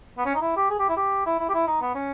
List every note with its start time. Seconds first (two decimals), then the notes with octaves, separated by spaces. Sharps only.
0.18 B3
0.26 C#4
0.35 D#4
0.41 E4
0.56 G4
0.70 G#4
0.79 G4
0.89 E4
0.97 G4
1.26 E4
1.39 E4
1.49 G4
1.54 E4
1.67 D#4
1.81 B3
1.95 C#4